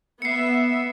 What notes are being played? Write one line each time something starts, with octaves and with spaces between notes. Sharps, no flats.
B3 E5 C7 C#7